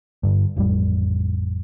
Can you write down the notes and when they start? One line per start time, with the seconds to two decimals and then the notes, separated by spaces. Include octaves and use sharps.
0.23 G2 D3
0.56 A1 F2 A2 G3